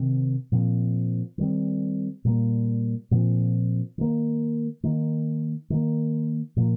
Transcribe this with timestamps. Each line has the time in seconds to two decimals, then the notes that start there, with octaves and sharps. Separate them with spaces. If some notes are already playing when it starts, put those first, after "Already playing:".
Already playing: C3 D#3 C4
0.52 A#2 F3 C4
1.38 D#3 G3 C4
2.25 A#2 G3 A#3
3.11 A#2 F3 C4
3.98 D#3 A#3
4.83 D#3 A#3
5.70 D#3 A#3
6.56 A#2 F3 A#3